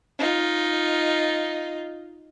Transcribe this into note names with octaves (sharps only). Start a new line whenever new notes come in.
D#4 F4